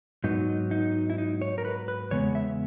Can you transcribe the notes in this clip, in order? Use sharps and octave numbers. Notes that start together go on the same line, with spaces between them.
G#2 F#3 B3 D#4
D#4
E4
D#4
C#5
A#4
B4
B4
E2 C#3 G#3 B3 C#5
E5